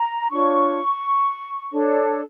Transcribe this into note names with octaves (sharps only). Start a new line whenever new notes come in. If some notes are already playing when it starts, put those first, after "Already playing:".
Already playing: A#5
D4 F4 C#5 C#6
D4 A4 C#5